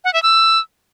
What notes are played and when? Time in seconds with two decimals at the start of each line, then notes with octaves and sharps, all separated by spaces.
0.04 F#5
0.14 E5
0.23 E6